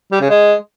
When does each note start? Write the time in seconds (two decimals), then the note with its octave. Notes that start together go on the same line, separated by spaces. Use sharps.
0.12 G3
0.21 C#3
0.30 G#3